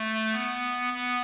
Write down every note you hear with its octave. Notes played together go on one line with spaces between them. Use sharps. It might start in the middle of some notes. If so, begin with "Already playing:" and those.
Already playing: A3
B3
B3